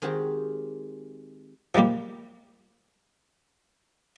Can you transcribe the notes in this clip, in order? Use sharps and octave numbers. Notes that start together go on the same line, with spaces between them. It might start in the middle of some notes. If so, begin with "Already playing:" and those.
D#3 G#3 C4 F#4 G4
F3 G3 G#3 A#3 G4